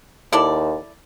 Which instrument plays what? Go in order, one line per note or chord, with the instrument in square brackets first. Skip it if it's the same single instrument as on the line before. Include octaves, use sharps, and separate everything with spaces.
[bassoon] D#2 [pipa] E4 A4 D5